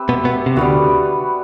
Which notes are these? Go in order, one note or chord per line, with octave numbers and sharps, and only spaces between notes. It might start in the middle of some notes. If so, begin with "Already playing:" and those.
Already playing: C4 G4 B4 E5
B2 B3
B2 B3
C3
D2 D3 G3 B3 F#4